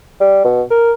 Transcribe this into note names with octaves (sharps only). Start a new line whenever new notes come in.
G3
B2
A#4